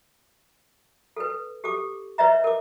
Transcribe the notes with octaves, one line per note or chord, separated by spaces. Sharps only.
A4 B4
G4 A4 D6
B4 C#5 D#5 E5 A#5
A#4 D6